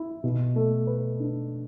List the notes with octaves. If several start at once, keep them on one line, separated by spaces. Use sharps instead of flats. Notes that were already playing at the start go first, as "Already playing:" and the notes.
Already playing: E4
B2
A3
B4
D4